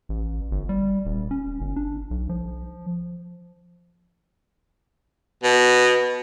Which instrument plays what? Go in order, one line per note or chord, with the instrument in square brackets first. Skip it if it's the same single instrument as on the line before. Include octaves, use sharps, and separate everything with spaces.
[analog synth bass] A1
G1
G3
D#1
C#4
G1
D4
B1
F3
[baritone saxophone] B2